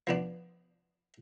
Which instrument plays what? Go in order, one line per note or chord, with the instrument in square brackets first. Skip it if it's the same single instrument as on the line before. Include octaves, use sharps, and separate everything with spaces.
[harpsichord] F3 B3 D4